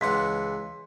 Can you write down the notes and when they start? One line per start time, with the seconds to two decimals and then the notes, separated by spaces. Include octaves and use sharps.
0.01 C#2 E3 F#5 C6 B6